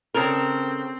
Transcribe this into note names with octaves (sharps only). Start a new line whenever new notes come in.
C#3 C4 A4 A#4